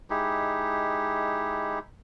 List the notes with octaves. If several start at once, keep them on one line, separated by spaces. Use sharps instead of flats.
G#3 D#4 E4 G4